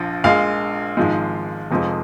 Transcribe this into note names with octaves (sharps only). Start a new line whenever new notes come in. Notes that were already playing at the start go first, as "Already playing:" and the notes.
Already playing: A#1 F3
A#1 A#2 G#3 F5
G#1 G#2 F3 G#3
F1 F2 F3 G#3